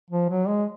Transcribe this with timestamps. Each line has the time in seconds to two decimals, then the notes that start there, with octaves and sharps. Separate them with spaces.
0.10 F3
0.30 F#3
0.48 G#3